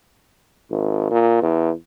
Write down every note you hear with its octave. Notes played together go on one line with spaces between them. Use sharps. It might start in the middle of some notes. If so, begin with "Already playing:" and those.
G#1
A#2
E2